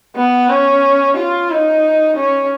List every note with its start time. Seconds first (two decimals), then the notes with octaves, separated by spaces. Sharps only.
0.16 B3
0.49 C#4
1.16 F4
1.50 D#4
2.17 C#4